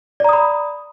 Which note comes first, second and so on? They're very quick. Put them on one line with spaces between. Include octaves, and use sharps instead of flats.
D5 A#5 D#6 B5